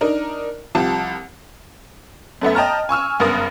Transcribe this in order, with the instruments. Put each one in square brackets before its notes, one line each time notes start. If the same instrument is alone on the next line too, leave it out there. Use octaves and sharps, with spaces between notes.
[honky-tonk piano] D4 D#4 A#4
C2 F3 G4 A5
F#2 A3 B3 E5
D#5 G5 A5 A#5 F6
G#5 C#6 E6 F6
F#1 G2 B3 A#4 D#6